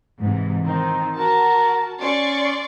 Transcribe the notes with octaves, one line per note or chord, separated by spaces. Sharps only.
G#2 C3 E3
D#3 C4 D#4
F#4 A#4 A5
C#4 D5 C6 C#6